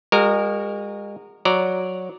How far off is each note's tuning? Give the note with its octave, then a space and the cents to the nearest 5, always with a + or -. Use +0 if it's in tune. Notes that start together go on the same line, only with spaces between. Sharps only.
G#3 -35 F#4 -5 A#4 -10
F#3 -10 D5 -5 A#5 +0